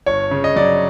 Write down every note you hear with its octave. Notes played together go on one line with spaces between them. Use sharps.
G1 C#5
C#3
D#5
F#3 D5